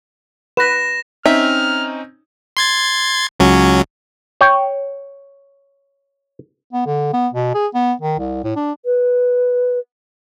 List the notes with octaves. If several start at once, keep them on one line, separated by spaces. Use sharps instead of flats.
B4 A#6 E7
C4 C#4 D#4 E5 F6
C6 G#6 A6
C#2 F#3 C#4
C#5 G5
B3
D3
B3
B2
G#4
B3
D#3
C2
A2
D4
B4